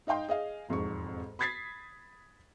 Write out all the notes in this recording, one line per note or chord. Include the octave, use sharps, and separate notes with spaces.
D#4 D#5 F5 G5 C6
G#4 D#5 F5
E1 F2 G#2 C#6
B5 D#6 G#6 A6 B6 C7